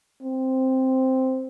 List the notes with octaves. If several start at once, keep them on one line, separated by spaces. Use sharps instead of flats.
C4